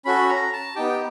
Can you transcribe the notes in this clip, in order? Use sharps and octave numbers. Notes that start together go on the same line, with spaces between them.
C#4 F#4 A4 B5
A#5
A5
B3 D#4 G4 G5